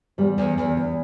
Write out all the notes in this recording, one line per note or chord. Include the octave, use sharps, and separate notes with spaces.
E2 G3
E2
E2
E2